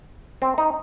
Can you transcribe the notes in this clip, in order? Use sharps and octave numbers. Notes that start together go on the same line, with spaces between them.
C4
D#4